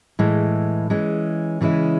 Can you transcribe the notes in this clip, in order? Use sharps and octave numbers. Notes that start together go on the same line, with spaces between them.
A2 E3 G#3
E3 G#3 C#4
C#3 E3 G#3 C#4 E4